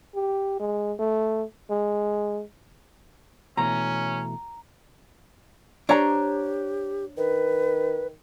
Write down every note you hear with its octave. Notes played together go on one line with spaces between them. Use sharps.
G4
G#3
A3
G#3
B2 E3 A3 C#4 A#5
D4 G4 C5 C#5 A#5
D#3 B4